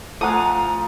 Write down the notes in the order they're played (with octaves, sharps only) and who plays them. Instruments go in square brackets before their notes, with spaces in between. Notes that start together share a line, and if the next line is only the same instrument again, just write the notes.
[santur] F3 [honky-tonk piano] A3 A#5 [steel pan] A4 F#5 G#5 [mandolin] F5 D#6